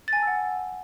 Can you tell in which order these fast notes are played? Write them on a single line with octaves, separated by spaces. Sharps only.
A6 G#5 A5 E6 F#5